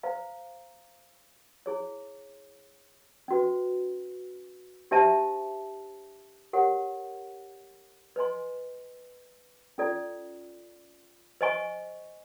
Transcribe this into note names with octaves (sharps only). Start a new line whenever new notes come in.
C5 F5 A#5
E4 G#4 C#5
C#4 F#4 B4
D4 G4 C5 E5 A5
G4 A#4 C#5 F#5
B4 D#5 G#5 C6
C#4 F4 A4 D5
C5 D#5 G#5 C#6